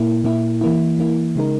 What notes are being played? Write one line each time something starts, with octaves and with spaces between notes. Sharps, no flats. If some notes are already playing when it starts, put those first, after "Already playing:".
Already playing: A#2 A#3 E4
A#2 A#3 E4
E3 A#3 E4
E3 A#3 E4
C#3 G#3 D#4 A#4